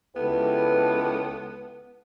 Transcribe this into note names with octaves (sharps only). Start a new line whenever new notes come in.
C#2 B3 E4 G4 A4 B4